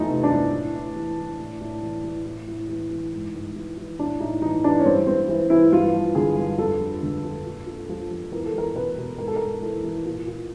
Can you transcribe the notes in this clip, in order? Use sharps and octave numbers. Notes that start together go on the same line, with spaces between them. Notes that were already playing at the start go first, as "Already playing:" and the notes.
Already playing: E2 F3 A3 D#4
C3
D4
E2
A2
A2
E3
E3
A2
A2
E3
E3
A2
A2
E3
E3
G#2
G#2
E3
E3
A2 D4
A2 D#4
E3 D#4
E3 D4
C#4
G2 C4
G2 C4
E3
E3 E4
G2 F4
F3
D3 G#4
G2
F2 A4
F3
D3
F2
A#2
A#2
F3
F3
E2 A#4
A4
E2 A#4
B2 B4
B2
G#2 A#4
A4
A#4
G#2
E3 A4
E3
A#2
A#2